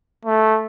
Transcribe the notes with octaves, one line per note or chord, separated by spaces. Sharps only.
A3